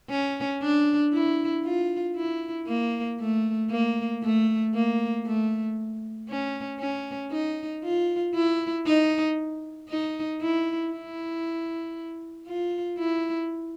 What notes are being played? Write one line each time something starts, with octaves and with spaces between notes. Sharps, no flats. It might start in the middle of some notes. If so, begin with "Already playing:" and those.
C#4
D4
E4
F4
E4
A#3
A3
A#3
A3
A#3
A3
C#4
C#4
D#4
F4
E4
D#4
D#4
E4
E4
F4
E4